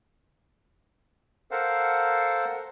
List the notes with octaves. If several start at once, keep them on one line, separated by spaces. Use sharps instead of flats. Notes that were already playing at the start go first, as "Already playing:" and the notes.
A4 A#4 C5 F5 F#5